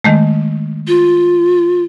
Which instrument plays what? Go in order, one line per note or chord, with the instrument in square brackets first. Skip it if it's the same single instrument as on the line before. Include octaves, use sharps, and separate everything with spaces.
[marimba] D#3 G#3 A3
[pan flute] F4